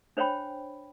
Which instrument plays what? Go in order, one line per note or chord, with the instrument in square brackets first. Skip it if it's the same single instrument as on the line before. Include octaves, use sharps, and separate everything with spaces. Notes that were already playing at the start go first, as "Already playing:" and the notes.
[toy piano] D4 C5 C#5 G5 B5